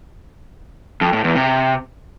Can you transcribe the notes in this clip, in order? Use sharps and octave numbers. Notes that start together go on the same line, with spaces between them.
F2
A2
E2
C3